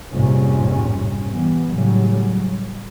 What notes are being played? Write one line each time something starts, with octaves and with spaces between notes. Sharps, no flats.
A#1 F2 G#2 C3 G3 C#4
E3 G3 B3
A2 C#3 F#3 G3